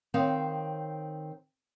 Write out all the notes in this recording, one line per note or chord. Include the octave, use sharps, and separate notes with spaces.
D#3 C4 C#5 F5